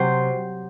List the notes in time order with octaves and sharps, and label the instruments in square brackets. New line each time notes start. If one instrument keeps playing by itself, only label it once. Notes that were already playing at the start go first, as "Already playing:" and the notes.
Already playing: [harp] C3 F#3 C5